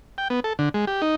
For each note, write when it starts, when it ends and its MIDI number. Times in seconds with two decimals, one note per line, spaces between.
0.18 0.28 79
0.30 0.40 59
0.44 0.53 69
0.59 0.69 50
0.74 0.85 56
0.87 1.02 67
1.02 1.15 63